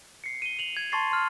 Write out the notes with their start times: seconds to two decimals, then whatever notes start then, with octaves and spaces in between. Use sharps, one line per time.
0.24 C7 C#7
0.42 D#7 G7
0.59 F7 F#7
0.77 G#6
0.92 A5 C6 C#6 A6 C7
1.11 C6 F6